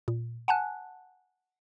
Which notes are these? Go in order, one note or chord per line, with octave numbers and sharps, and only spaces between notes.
A#2
F#5 G#5 A5 F#6